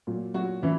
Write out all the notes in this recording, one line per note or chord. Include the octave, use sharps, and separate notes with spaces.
A#2 F#3
F#3 F#4
C#3 E3 E4